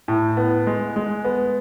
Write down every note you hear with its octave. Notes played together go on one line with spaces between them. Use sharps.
A2
B3
G#3
G#3
B3